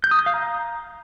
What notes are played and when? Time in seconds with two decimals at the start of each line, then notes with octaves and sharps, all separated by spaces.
0.04 G6
0.11 D#6
0.19 G6
0.26 F5
0.34 A#5